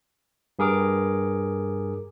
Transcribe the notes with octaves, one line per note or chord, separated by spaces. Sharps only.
G2 G#4 A#4 D6